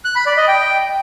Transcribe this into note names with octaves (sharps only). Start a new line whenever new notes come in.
F#6
B5
D5
D#5
G5